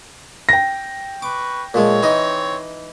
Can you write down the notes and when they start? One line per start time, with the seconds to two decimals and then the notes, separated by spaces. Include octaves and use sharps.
0.49 G5 A#6
1.22 B4 C#6 D6
1.74 A#2 F3 G#3 C4 C#5
2.03 E3 D#4 D#5